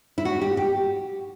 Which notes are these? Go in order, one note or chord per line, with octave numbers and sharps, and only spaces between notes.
E4
F#4
G4
G4